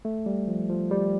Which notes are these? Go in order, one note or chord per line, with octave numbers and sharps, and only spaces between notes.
A3
G3
F3
F3
G3